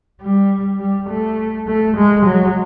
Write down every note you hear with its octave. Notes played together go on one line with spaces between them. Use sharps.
G3
G3
A3
A3
G#3
F#3